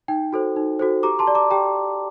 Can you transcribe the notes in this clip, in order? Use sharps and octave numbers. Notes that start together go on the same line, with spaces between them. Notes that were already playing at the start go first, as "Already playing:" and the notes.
D#4 G5
F#4 A4 C5
D#4
F#4 A4 C5
G4 A#5 D6
A5 C6
D5
A#5 D6
G4 G5 A#5